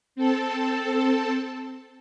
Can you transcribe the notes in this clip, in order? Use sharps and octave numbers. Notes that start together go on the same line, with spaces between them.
C4 A4 A5